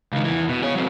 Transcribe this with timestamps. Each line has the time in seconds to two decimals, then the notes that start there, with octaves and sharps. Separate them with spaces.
0.12 C#2 D#3
0.24 E2 E3
0.49 B2
0.63 G#4 C#5
0.75 F#3 C4